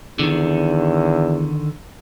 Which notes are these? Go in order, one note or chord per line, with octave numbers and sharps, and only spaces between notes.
E2 D3 D#3